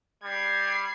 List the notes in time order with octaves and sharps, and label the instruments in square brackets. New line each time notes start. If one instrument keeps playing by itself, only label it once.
[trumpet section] G3 [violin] G#6 C7